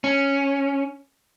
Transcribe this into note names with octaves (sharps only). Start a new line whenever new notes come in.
C#4